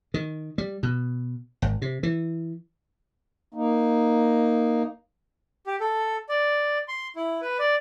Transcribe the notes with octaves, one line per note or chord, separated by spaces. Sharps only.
D#3
G3
B2
G#1
C3
E3
A#3 D#4
G4
A4
D5
C6
E4
B4
D5